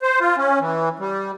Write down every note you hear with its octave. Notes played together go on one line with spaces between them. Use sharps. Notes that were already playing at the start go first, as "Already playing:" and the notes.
C5
F4
C#4
E3
G3